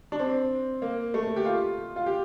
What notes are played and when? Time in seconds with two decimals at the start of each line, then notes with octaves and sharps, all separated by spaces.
0.12 D4
0.20 C4
0.82 A#3
1.14 A3
1.36 G4
1.45 F4
1.96 F4
2.06 G4